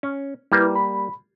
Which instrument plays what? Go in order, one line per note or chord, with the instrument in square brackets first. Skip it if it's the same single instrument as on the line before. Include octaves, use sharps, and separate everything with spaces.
[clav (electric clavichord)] C#4
[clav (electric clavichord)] G3 A#3 [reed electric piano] E4 B4
[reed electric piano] B5